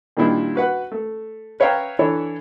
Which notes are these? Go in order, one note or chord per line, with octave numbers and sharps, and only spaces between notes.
A#2 D#3 G3 D4 E4 F4
F#4 B4 F#5
A3
B4 C#5 E5 F5 G5 A#5
E3 D4 E4 A4 C#5